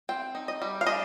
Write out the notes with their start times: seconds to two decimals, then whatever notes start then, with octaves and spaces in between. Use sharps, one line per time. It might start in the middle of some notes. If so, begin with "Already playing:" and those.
0.09 C4 G5
0.35 D#4
0.48 D#5
0.62 G3
0.81 F5
0.86 D4 D#5